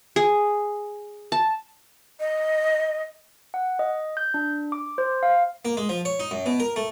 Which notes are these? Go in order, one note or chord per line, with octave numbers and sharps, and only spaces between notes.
G#4
A5
D#5
F#5
D#5
G6
D4
D6
C5
F5
A#3
G#3
F3
C#5
D#4
F#2
B2
A#4
A3